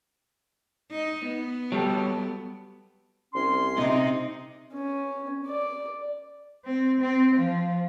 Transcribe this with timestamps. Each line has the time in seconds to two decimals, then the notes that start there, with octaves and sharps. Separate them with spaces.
0.92 D#4
1.26 B3
1.72 F#3 G3 A4
3.33 C2 C#4 C6
3.76 C3 D#4
4.73 C#4
5.46 D5
6.65 C4
7.00 C4
7.35 F3